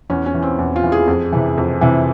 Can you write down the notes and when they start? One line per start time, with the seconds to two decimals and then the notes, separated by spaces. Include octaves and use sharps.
0.10 E2 C#4
0.26 C#4
0.34 E3
0.42 C4
0.59 E2
0.76 F4
0.84 E3
0.92 G#4
1.08 F2
1.32 C3 E3
1.58 F2
1.81 C3 E3